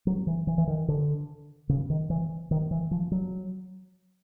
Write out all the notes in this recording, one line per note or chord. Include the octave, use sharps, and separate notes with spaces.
F#3
E3
E3
E3
D#3
D3
C#3
D#3
E3
D#3
E3
F3
F#3